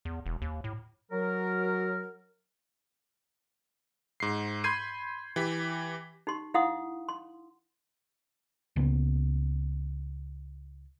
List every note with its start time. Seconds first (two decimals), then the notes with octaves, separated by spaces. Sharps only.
0.05 E2
0.26 E1
0.42 D#2
0.64 A2
1.11 F#3 A#4
4.20 G#2 C7
4.64 B5 C6 G6 G#6 C7 D#7
5.36 E3 G4 B6
6.27 D#4 G4 C6
6.54 D#4 E4 F5 F#5 C6 D#6
7.09 C6
8.76 C#2 C#3 A#3 B3